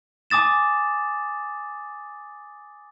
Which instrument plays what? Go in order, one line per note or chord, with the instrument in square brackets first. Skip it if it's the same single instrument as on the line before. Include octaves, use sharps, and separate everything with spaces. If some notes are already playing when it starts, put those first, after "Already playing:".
[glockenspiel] G#5 D6 D#6 A6 E7